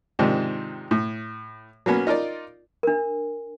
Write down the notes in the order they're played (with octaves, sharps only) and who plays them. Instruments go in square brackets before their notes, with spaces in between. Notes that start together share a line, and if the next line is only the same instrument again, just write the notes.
[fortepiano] G#2 C3 D#3 F3 D4 D#4
A2
F#3 A#3 B3 C#4
D#4 F4 A#4 D5
[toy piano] D4 A#4